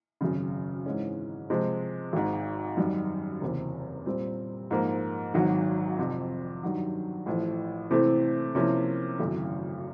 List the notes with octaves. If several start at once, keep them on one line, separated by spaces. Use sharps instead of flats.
G#1 F#2 C#3
G#2 E3 G#3 C#4
C3 F3 G#3
G#1 G#2 D#3
F#2 D#3 G3
F#1 E2 C3
A#2 G3 C4
G#2 F3 A#3
G#1 G#2 D#3 F#3
F2 C3 F3
G2 D#3 F#3
A1 A2 F3
C3 E3 A3 C4 E4
C3 F3 A#3 C#4 E4
G#1 F#2 C#3 E3 A3